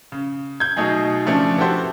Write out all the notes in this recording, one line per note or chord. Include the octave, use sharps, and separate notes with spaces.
C#3
G6 G#6
B2 F#3 A3 D#4 G#4
C#3 F3 A3 C#4 D4
B3 E4 F#4 G4 A4 C5